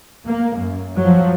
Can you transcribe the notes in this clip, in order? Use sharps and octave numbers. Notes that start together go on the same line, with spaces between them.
A#3
F#2
F3 F#3